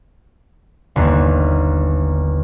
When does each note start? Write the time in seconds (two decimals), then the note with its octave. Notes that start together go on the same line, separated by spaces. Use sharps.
0.96 G1 D#2